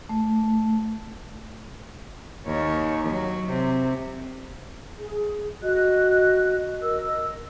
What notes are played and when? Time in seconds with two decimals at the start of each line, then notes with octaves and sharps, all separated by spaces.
0.09 A3
2.46 D#2 C#5
3.09 F#3
3.50 C3
4.98 G#4
5.63 F#4 D#5 F#6
6.82 A#4 D#5 E6